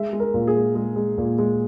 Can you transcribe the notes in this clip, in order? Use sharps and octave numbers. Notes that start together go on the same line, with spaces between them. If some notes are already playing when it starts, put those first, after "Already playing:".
Already playing: G#3 E5
G#3
A#4
A#2
G#4
G#3
G#3
G#3
A#2
G#3